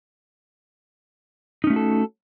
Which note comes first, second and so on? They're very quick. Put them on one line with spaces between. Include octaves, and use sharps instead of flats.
D#4 C#4 A3 F#4 A4